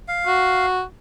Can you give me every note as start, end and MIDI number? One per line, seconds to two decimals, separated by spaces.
0.08 0.66 77
0.27 0.82 66